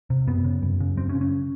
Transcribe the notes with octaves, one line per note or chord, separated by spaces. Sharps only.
C3
F#2 B3
C#3
F#2
C#3
F#2 C4
C#4
C#3
C#4